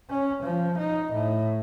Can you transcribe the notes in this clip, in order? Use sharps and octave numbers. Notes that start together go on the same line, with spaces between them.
C#4
F3
D#4
A2